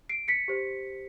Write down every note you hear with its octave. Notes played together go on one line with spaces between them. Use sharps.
C7 D7
B6 C#7
G4 C5